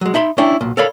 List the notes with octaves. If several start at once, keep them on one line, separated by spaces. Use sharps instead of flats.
F#3 G#3
D#4 E5 B5 C6
C#4 D4 E4 G5
B1 A#2
A4 A#4 C#5 D5 F5 B5